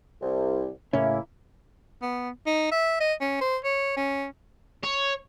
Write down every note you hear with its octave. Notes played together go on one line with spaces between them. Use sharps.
C2
A2 C#3 A#3 C#4 E4
B3
D#4
E5
D#5
C#4
C5
C#5
C#4
C#5